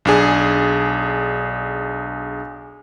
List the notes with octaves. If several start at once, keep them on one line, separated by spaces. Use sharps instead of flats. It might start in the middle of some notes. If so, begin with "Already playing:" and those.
B1 D4 G#4